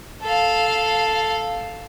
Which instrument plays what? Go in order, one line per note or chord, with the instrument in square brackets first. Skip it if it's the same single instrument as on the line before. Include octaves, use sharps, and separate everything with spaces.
[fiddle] A4 F5